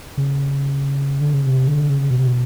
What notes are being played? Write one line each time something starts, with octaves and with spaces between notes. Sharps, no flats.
C#3
D3
C#3
C3
D3
C#3
B2
C3
B2